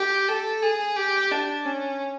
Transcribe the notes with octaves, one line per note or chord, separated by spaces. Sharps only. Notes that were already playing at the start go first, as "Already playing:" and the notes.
Already playing: G4
A4
G#4
G4
D4
C#4